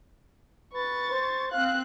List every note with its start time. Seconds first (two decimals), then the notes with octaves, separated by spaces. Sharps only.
0.74 B4 C#6 A6
1.11 C5
1.52 C4 F5 F#6